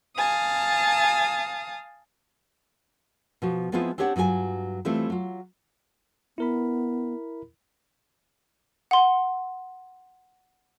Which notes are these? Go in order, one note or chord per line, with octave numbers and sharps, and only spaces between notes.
F5 G#5 A5 D#6
B2 F3 F#4
F3 G#3 B3 C4 E4 F4
C4 D4 G4 C#5 D5 F#5
G2 F#3 F4 G#4 G#5
E3 G3 A3 C4 E4 F4
F#3 F4
B3 E4 A#4 B5
F#5 C6